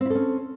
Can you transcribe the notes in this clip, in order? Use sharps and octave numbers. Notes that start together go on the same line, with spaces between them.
C4 C#4 E4 A4